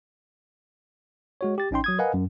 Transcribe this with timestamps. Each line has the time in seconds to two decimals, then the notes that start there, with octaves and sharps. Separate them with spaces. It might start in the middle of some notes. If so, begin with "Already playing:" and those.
1.41 G#3 F#4 C#5
1.58 G4 A6
1.71 A1 C#4 D#4 G5 C6
1.84 F#3 D#6 G#6
1.99 A#4 B4 D#5 F5 F#5 G#5
2.14 F#2